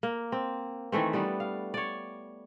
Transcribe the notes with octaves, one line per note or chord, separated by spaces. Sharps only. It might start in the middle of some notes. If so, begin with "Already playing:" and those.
A#3
C4
D#3 E3 A3 C4
G3 B3 D4
F5
C#5 D5